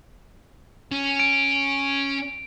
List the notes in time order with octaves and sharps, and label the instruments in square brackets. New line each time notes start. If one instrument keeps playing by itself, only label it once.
[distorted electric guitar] C#4
[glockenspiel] D7